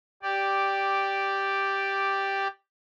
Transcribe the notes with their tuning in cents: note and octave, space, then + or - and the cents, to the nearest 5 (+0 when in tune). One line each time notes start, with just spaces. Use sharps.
G4 +0 D5 +0